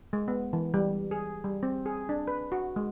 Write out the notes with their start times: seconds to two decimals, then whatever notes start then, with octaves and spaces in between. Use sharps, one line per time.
0.13 G#3
0.28 B3
0.53 E3
0.74 G3
1.11 G#4
1.44 G3
1.63 C4
1.86 G#4
2.09 D4
2.28 B4
2.52 F#4
2.76 G#3